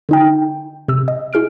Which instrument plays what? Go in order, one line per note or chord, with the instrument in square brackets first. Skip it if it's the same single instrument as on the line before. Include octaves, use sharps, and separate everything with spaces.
[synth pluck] D3 D#4 G5
C3 E6
D#5
E4 G#4 F6 D7